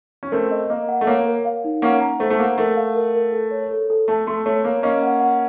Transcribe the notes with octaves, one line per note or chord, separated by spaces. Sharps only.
C#4
A3 C4 A#4
D#5
A#3 D#5
F#5
A3
A#3 C#5
A#4
F5
D#4
A#3 C#4 F#5
A#5
A3 C5
A3
A#3 F#5
A3 A#4
F5
A#4
A#4
A4
C#5
A4
A4
A3 A5
A3 C6
A3 C#5
A#3 C#5
A#3 C#4 D#5
F#5
F#5